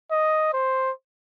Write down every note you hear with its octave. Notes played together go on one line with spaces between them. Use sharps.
D#5
C5